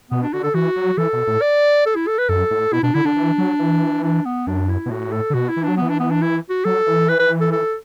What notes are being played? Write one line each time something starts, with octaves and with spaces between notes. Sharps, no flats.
B2 B3
D4
D3 F#4
A4
E3 F#4
F#3
E3 A4
B2
A2
D5
A4
E4
A4
B4
F#2 A4
A2
B2 E4
B2 D4
D3 E4
D3 D4
E3
F#3
E3
D4
B3
F#2 D4
E4
B2
A2 F#4
A4
D3
B2 F#4
E4
E3
F#3 D4
E3 B3
D4
B3
D4
E4
F#4
F#3 A4
E3
B4
B4
A4
A4